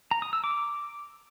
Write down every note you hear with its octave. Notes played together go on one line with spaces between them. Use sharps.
A#5
D#6
E6
D6